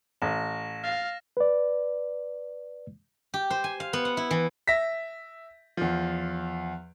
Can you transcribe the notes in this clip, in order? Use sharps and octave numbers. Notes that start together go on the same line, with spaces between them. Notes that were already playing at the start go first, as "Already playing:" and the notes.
A1 A#6 E7
F5 F6 A6 A#6
B4 D5
G4
C5
G#5
F5
B3
F#5
E4
E3
E5 A#6 B6
E2 F3